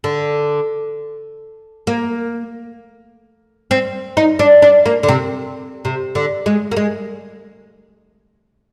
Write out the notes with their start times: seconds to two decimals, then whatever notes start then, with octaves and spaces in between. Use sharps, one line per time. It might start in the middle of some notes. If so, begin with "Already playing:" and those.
0.04 D3
1.87 A#3
3.71 C4
4.17 D#4
4.39 D4
4.62 D4
4.86 A#3
5.03 D3
5.08 C3
5.85 C3
6.15 D3
6.46 G#3
6.71 A#3
6.77 G#3